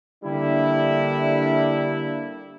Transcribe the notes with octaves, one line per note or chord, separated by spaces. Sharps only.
D3 G3 A#3 D4 E4